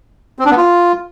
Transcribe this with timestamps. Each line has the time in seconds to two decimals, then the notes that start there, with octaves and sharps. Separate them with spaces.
0.39 C4
0.45 D4
0.51 B3
0.57 F4